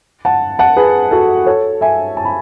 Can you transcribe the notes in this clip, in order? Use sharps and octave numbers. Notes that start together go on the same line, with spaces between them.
F#5 A5
F#5 A5
G#4 B4
F#4 A4
A4 C#5
E5 G#5
A5
B5